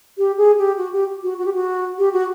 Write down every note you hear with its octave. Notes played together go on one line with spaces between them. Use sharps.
G4
G#4
G4
F#4
G4
F#4
F#4
G4
F#4
G4
F#4